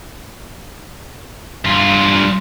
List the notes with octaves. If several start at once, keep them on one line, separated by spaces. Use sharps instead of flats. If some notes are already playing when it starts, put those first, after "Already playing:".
G2 F4